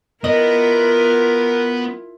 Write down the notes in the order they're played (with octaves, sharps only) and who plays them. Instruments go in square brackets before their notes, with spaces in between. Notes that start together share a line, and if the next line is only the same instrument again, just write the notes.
[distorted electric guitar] B3 [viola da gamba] E4 F4 [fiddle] A#4 [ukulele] D#5